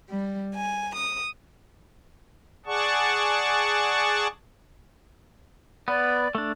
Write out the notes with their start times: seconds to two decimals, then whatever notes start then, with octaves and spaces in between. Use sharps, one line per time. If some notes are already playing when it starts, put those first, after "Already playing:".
0.10 G3
0.55 G#5
0.95 D#6
2.66 G#4 D5 F#5 A5 C#6
5.88 B3 B4 D5
6.35 A3 D4